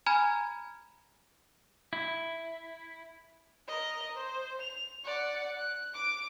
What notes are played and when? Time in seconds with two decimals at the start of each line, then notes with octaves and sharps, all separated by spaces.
0.06 G#5 A#5 B5 F6 G#6
1.93 E4
3.68 A#4 D#5
4.15 C5
4.61 F7
5.04 D5 F#5
5.58 F#6
5.93 D6 D7